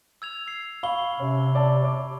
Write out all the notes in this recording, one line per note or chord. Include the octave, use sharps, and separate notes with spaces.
E6 G#6 F7
E6 C7
F5 B5 C#6 G7
C3 C#4
D5 A5
C#5 D6